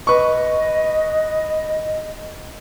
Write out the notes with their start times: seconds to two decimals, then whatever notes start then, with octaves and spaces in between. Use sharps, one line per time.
0.07 B4 D#5 C#6